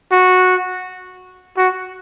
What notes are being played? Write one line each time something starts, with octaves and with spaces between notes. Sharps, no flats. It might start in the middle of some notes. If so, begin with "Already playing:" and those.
F#4
F#4